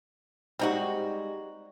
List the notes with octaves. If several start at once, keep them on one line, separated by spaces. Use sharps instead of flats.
G3 G#3 C4 D#4 F#4 G4